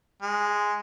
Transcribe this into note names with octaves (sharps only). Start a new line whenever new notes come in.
G#3